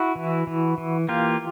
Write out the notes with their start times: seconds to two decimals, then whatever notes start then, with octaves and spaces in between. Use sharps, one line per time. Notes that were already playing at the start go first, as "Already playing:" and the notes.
Already playing: E4 F#4
0.16 E3
0.47 E3
0.78 E3
1.09 A#3 F4 G4